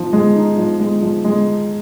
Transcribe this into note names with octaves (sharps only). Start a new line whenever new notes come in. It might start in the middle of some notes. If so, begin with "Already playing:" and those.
Already playing: F3 D#4
G#3
D#4
F3
G#3
F3
G#3